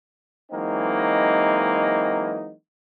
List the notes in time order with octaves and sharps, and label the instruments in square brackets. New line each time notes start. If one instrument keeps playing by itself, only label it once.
[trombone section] E3 F#3 G#3 A#3 C4 D#4